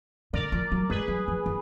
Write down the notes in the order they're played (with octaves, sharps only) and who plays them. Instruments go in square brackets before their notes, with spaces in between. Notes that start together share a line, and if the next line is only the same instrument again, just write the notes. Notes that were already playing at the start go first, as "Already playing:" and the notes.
[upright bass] D3 [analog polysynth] A#4 D5
[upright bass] F3
F#3
[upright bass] G#3 [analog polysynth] G#4 B4
[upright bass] F#3
F3
D#3